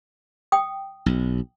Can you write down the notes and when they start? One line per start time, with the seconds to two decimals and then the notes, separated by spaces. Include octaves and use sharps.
0.52 G5 D#6
1.06 B1